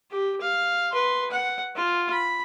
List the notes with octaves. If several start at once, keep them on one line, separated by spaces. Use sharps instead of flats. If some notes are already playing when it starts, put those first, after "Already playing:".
G4
F5
B4 C6
F#5
F4
B5